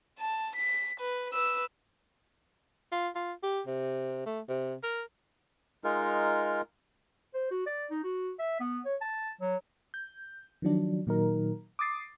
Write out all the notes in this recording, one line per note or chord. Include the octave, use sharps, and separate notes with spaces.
A5
B6
B4
B4 E6
F4
F4
G4
C3
A3
C3
A#4
G#3 D#4 F4 A#4
C5
F#4
D5
D#4
F#4
E5
B3
C#5
A5
F#3
G6
D#3 F3 F#3 D4
A#2 D#3 F#3 D#4 A#4
D6 D#6 A6 C7